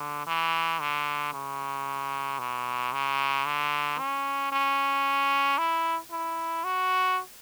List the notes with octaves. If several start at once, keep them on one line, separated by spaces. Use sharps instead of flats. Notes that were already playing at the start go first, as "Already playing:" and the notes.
Already playing: D3
E3
D3
C#3
B2
C#3
D3
C#4
C#4
E4
E4
F#4